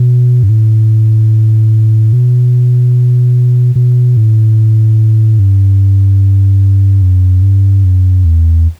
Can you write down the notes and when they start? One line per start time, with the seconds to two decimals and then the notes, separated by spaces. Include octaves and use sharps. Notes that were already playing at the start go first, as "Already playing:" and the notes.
Already playing: B2
0.43 G2
0.49 A2
2.13 B2
3.76 B2
4.17 A2
5.39 G2
7.02 F#2
7.42 G2
7.84 F#2
8.25 E2